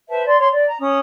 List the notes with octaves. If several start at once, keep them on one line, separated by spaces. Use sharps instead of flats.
B4 C5 E5 A5
D5 C6
C#5 C6
D5
A#5
C#4 D#6